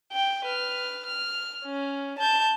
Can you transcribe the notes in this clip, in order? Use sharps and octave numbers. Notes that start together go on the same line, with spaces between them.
G5
B4 F6
F6
C#4
A5 G6